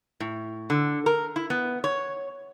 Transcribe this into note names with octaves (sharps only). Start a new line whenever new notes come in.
A2
D3
A#4
E4
B3
C#5